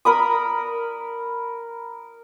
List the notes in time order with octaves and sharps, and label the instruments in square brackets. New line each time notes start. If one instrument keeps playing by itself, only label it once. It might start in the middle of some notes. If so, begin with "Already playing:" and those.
[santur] A#4 B5 D#6